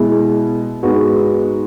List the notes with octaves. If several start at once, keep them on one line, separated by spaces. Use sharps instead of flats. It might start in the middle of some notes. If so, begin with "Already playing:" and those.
Already playing: B2 G#3 E4 G#4
G#2 G#3 B3 F#4